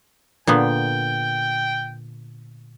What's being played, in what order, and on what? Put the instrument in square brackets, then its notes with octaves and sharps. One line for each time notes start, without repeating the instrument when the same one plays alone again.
[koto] A#2 D3 B3 [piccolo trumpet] G5